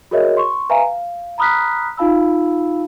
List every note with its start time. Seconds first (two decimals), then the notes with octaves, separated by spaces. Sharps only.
0.11 F#4 G#4 A#4 C#5 D#5 E5
0.37 C6 C#6
0.70 B4 E5 F5 G#5 A#5
0.87 F5
1.38 A#5 B5 D#6 F6 F#6 B6
1.97 D#4 F4 F5 A5 B5 E6